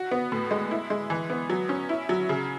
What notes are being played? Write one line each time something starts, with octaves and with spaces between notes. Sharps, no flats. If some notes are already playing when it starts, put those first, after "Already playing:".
Already playing: F#4
B3
A2
G#3
E4
G#3
E3
B3
F#3
C#4
E4
F#3
C#3